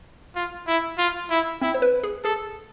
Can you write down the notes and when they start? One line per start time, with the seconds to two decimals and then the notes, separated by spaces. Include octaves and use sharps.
0.35 F4
0.67 E4
0.98 F4
1.30 E4
1.61 C4 E4
1.74 C5
1.82 B4
2.03 G#4
2.24 G#4 A4